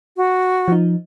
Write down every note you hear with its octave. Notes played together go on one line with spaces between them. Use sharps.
F#4
F3 D#4